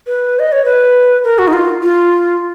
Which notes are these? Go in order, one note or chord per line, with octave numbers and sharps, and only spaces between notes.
B4
D#5
C#5
B4
A#4
F#4
D#4
F4
F4